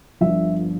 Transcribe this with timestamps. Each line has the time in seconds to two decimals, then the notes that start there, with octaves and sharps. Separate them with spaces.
0.21 G1 G2 D3 F3 E5